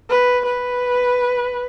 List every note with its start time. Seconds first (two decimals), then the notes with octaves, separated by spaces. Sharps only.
0.10 B4
0.46 B4